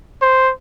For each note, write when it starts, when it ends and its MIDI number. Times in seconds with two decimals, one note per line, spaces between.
0.22 0.52 72